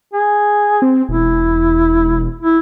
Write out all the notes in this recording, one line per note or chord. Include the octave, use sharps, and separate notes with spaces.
G#4
C4
E1 E4
E4